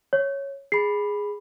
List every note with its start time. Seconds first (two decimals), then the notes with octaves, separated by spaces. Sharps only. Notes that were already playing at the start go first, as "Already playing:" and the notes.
0.13 C#5
0.72 G#4 B5 C7